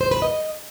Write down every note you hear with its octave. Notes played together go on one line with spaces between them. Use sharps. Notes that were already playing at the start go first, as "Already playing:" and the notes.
C5
B4
D#5